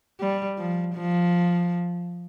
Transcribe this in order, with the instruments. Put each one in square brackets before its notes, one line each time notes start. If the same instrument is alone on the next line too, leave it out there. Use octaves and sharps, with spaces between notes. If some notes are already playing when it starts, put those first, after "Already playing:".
[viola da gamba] G3
F3
F3